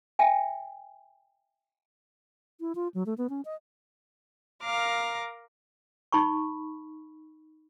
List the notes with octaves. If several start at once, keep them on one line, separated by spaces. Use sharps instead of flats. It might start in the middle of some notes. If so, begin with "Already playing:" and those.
E5 G5 G#5
E4
F4
F#3
A3
B3
C#4
D#5
A#4 F5 A#5 D6 F6
D#4 B5 C#6